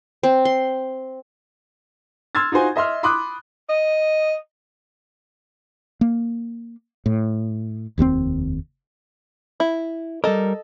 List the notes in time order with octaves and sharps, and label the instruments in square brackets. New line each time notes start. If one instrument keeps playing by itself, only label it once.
[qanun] C4
C6
[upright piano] C6 E6 F6 G#6 A6
D#4 F4 F#4 C5 G#5
D#5 E5 C6 F6
B5 C6 D6 D#6 F#6
[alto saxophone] D#5
[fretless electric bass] A#3
A2
F1 D#2 G#2 C4
[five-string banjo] E4
[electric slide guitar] G3 A#4 [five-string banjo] A4 D#5